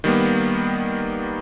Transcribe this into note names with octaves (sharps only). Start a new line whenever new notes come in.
D#3 G3 A#3 B3